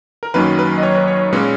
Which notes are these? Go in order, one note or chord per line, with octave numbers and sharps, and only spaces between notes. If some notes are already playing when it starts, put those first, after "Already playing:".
A#4
F#2 D#3 F#3 A#3 C#4 B4
B4
D#5
C#5
B4
C#5
A#2 G#3 C#4 B4